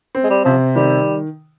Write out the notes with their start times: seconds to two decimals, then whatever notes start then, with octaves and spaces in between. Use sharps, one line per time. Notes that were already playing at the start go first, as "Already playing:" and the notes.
0.15 C4
0.24 G#3
0.30 G3
0.45 C3 F3
0.75 D#3 G3